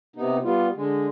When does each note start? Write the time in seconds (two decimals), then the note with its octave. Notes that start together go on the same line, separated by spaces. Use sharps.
0.16 C3 B3 D#4
0.43 G3 B3 F4
0.76 D3 G#3